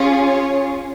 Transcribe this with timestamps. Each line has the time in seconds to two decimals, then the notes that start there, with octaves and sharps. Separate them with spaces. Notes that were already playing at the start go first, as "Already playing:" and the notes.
Already playing: C#4 F4 G#4
0.25 C#5